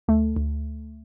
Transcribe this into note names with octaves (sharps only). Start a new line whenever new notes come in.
D2 A3
D2